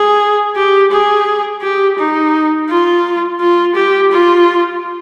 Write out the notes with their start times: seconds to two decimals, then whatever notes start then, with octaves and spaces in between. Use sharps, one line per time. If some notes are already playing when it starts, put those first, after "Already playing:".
Already playing: G#4
0.56 G4
0.91 G#4
1.62 G4
1.98 D#4
2.69 F4
3.40 F4
3.75 G4
4.11 F4